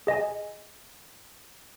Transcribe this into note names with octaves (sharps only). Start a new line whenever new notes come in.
G#4 D#5 G#5